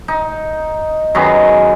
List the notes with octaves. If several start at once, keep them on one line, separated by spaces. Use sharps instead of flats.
D#4
F#2 D#3 B3 G#4